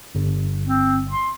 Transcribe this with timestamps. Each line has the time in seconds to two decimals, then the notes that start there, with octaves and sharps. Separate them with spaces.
0.15 G1
0.66 C4
1.11 C6